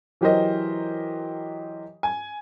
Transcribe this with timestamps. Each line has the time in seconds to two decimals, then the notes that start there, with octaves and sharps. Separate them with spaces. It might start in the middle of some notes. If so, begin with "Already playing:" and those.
0.21 E3 F#3 G4 A#4 C5 D#5
2.03 G#5